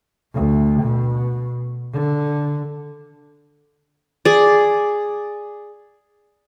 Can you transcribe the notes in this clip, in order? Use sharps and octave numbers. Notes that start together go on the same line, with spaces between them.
D2
B2
D3
G#4 D5